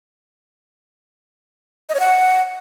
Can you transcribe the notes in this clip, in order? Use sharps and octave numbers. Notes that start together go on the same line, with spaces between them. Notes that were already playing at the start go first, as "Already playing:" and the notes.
D#5
C#5
F#5